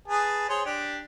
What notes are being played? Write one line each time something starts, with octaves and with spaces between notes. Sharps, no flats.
G#4 B4 A5
G#4 C5 C#5
D4 G4